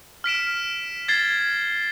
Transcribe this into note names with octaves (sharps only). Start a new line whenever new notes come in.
F6 B6 D7 E7
G#6 A6 C7 G7